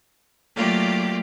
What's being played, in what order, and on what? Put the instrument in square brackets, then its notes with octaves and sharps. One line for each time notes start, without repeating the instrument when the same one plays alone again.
[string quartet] F#3 A3 A#3 F4 G4 D5